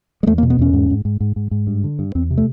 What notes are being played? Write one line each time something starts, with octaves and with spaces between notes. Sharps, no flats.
G#3
E2 A3
A#3
B2
B3
E2 C#4
G#2
G#2
G#2
G#2
G#2
G#2
G2
D3
G2
E2 C4
C3
A3